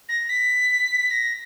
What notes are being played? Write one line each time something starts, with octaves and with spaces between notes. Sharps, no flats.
A#6
B6
A#6